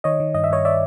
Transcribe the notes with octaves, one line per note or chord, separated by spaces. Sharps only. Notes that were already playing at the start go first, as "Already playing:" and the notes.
D#3 C#5 D#5
D#3
G2 D#5
E5
G2 C#5 D#5
D5 E5